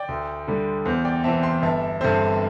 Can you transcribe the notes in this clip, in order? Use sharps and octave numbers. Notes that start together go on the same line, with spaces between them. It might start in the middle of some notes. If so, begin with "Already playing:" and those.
Already playing: D5 G5
D2
D3 G3
E2 C5
D5 G5
E3 C4 E5 A5
G5 C6
G1 E5 A5
G2 D3 C4 C5 E5